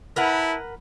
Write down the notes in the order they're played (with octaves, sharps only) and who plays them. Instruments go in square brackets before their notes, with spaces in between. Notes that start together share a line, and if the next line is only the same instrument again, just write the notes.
[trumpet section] E4 A5 [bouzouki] A#4 B4 F#5